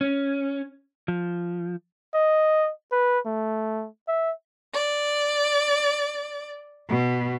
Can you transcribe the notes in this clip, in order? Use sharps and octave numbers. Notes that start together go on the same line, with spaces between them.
C#4
F3
D#5
B4
A3
E5
D5
B2